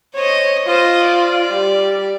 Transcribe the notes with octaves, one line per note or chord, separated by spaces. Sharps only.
C5 C#5 D#5
F4 C5 D#5
D5
G3